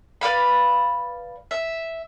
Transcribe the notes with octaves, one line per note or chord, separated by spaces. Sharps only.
B4 D5 F5 B5
E5